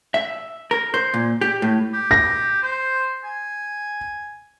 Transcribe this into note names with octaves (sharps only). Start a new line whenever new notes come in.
E5
A#4
C5
A#2
G4
A2
G4
A#6
C5
G#5